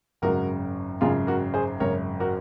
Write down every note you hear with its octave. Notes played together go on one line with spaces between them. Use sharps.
G#1 F#2 C#3 F#4 A#4
G#1 F#2 C#3 F4 G#4
F#4 A#4
G#4 C5
G#1 F#2 C#3 A#4 C#5
F#4 A#4